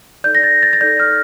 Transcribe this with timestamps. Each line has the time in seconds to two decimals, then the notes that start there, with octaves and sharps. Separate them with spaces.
0.24 D#4 A4 D5 G6
0.35 A#6
0.44 A6
0.63 A6
0.73 A6
0.81 D#4 A4 D5 G6
1.00 F6